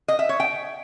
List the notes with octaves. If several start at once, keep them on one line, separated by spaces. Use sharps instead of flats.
D#5
E5
C#5
G5